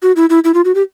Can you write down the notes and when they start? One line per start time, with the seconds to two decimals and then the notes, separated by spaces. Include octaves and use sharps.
0.02 F#4
0.16 E4
0.30 E4
0.44 E4
0.54 F4
0.65 F#4
0.75 G4